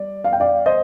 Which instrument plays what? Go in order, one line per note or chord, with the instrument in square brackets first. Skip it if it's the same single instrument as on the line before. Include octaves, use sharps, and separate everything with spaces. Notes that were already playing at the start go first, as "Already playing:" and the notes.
Already playing: [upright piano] G3 D5
F5
G5
D5 F5
C5 D#5